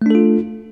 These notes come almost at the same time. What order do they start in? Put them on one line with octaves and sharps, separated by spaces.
A3 D4 A4 F4